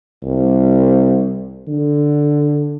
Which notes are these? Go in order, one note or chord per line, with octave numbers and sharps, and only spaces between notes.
C2
D3